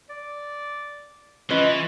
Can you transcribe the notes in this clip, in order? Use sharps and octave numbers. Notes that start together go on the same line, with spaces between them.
D5
E3 C#4 F4 B4 D#5